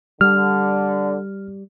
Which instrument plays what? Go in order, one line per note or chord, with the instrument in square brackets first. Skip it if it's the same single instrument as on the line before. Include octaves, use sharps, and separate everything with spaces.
[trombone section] D3 [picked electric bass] G3 [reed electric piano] F6